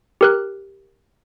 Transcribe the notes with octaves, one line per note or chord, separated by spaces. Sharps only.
G4 A#4 F#6